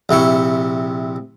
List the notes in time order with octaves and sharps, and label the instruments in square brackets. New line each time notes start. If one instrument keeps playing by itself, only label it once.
[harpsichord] A#1 C3 E4 C#6